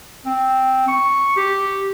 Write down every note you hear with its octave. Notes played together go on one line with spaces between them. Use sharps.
C4
C#6
G4